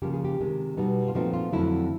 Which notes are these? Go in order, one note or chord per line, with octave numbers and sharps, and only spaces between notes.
C#3 F3 A#3 G4
G#4
G4
C3 D#3 G#3
B2 G3 B3 D#4
F4
A#2 F3 A3 C4 D#4 F#4
F4
F2 D3 F#3 A3 C4 E4